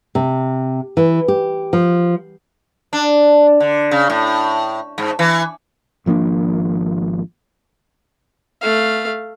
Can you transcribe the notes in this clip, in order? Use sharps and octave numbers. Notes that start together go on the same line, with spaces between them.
C3
E3
G4
F3
D4
D3
C#3
A2
G#2
E3
G#1 F3 A#3 D4
A3 F5